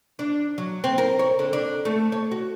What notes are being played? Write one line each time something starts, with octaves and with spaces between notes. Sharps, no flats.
D4
F#3
C4
A#4
C#5
D3
D4
A3
C#5
F#4